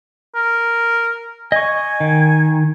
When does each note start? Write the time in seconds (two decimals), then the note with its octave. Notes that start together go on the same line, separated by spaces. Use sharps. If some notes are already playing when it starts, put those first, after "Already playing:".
0.35 A#4
1.52 D#5 G#5 C#6
2.00 D#3